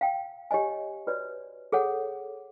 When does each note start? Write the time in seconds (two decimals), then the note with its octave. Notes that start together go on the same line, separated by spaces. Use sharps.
0.01 F5 G5
0.51 G4 C#5 D#5 G#5
1.07 F#4 B4 C#5 D5
1.72 G#4 A4 C#5 F#5